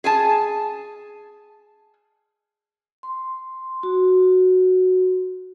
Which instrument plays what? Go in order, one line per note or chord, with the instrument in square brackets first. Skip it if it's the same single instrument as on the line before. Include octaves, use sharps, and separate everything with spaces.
[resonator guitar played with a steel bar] G#4 G#5 A5
[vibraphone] C6
F#4